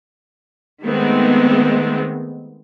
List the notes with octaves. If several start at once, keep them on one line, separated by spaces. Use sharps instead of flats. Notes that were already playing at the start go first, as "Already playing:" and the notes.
D#3 G#3 A3 B3 C4